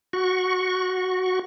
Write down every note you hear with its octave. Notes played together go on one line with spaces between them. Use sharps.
F#4 C#6